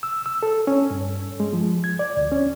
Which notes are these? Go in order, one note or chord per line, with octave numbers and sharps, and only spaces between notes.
E6
E6
A4
C#4
G2
G#3
F3
G#6
D5
D2
C#4